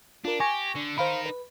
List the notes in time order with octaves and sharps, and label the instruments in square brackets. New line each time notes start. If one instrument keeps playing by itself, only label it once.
[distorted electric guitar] D4 [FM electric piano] F4 A#4
[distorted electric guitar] G4 [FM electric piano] G#5 C#6 A#6
[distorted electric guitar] D3
[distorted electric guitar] D#4 A#4 [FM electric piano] C5 F5 B5
[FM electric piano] B4